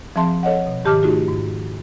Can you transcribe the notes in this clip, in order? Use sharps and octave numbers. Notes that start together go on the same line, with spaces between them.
F3 C4 G#4 E5 A5 C6
A4 C#5 D#5 F#5
B2
G#2 D#3 G4 A5 D6 F6
A3 D#4 F4 F#4 G#4
G#2